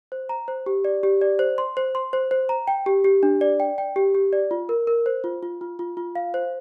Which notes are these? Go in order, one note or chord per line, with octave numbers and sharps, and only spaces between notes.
C5
A#5
C5
G4
D5
G4
D5
C5
C6
C5
C6
C5
C5
A#5
G5
G4
G4
D4
D5
G5
G5
G4
G4
D5
F4
A#4
A#4
C5
F4
F4
F4
F4
F4
F5
C5